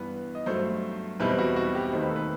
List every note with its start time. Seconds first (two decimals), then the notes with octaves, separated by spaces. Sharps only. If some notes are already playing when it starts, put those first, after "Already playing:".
Already playing: G2 E3 B3 B4
0.35 D#5
0.46 G2 F#3 A3 C5
1.20 E2 B2 G3 C4 E4 B4
1.38 F#4
1.56 F#4
1.75 G4
1.93 D#2 D#3 A3 D#4 C5
2.01 B4
2.09 A4
2.16 B4